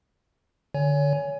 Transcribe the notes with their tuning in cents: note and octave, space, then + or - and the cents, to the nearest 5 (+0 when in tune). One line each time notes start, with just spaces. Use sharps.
D3 +0 C#5 +30 G#5 +0